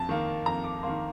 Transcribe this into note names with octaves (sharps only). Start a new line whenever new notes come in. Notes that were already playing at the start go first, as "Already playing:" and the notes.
Already playing: F2 A5
D#3 A#3
F2 A#5
D6
D#3 A#3 C6